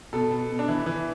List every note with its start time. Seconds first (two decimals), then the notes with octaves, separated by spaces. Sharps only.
0.13 B2 A4
0.31 B2
0.49 B2
0.59 D4
0.68 E3 E4
0.86 E3